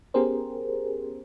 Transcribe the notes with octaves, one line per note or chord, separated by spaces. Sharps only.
B3 C#4 G4 G#4 A#4 C5